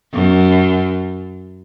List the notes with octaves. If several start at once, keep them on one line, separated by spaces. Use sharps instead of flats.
F#2